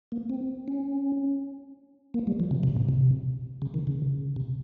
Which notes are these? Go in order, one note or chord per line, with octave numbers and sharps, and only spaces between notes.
A#3
C4
C#4
A#3
G3
F3
C#3
C3
A#2
C3
C#3
D#3
C#3
C3